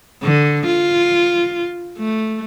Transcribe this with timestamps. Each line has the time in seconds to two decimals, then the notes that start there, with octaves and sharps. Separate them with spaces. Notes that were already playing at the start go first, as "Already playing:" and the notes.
0.23 D3
0.67 F4
1.98 A3